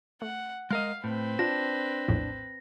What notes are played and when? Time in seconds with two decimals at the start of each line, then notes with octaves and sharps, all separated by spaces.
0.22 A3 F#5
0.70 G#3 A#4 D#5 F5 F6
1.04 A2 C4 B4
1.39 D4 F4 A#6
2.08 A#1 E2 A2